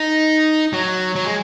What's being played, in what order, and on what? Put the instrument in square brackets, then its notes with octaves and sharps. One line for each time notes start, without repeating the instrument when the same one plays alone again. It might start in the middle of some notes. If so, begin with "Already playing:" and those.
Already playing: [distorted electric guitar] D#4
F#3
F#3
G#3